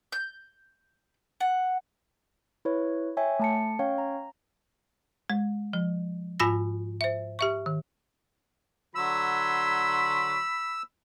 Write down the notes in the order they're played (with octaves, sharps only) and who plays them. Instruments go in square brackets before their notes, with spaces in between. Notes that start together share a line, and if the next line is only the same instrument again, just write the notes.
[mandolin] G6
F#5
[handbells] E4 B4 C#5
C#5 E5 G5 G#5
A3 A5 C#7
C#4 C#5 F5 G5
A#5
[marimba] G#3
F3
G#2 F4 G#5 B5 E6 A#6
C5 E5
G4 E5 C#6
D#3
[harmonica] D3 F#3 C6 [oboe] B5 [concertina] E6